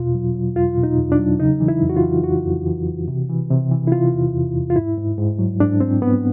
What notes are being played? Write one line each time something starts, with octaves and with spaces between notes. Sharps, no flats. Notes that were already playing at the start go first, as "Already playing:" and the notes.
Already playing: E2 B2 F4
F#3
F#3
E2 F4
B2
D#4
E2
D4
F#3
C#3 D#4
E3
E4
F2
F#4
F4
E3
F2 F#4
F2
E3
E3
C3
E3
C3
E3
E4
C3 F4
E2
E2
E2
F4
G#2 E4
G#2
G#2
F#3
G#2 D4
G#2 C4
G#2 B3